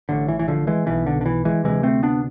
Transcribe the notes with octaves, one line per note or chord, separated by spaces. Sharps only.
A1 A2 D3
E3
E3
D3 F3
E3 G#3
B1 B2 E3
D3
D3
E3
E3 G#3
D2 C3 E3 G#3
A3 C4
B3 D4